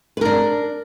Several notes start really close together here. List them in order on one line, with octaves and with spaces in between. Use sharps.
B4 A#4 D4